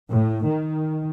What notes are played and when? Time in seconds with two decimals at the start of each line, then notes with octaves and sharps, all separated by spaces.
0.12 A2
0.48 D#3